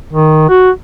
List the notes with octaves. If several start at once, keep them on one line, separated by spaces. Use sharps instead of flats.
D#3
F#4